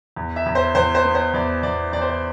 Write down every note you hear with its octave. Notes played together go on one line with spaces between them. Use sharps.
E2
E5
E2
C5
E2 C5
C5
B3
C5
E2 D5
E2 D5
E2 D5
C5
D5